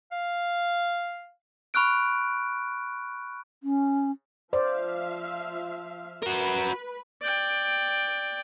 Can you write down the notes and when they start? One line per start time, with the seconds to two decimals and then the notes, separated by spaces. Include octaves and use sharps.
0.12 F5
1.74 B5 C#6 F6 F#6 D7
3.63 C#4
4.53 F3 C5 D5 E5 F5
6.23 F#4 A#4 B4 B5
7.22 D5 G5